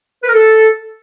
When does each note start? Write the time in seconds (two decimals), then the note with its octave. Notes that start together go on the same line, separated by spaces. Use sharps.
0.23 B4
0.28 A#4
0.34 A4